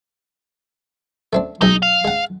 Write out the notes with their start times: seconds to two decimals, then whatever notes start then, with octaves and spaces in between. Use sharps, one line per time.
1.33 A3 C4 D4
1.62 B1 G#3 D#4 A#5
1.82 F5
2.05 G#3 F#5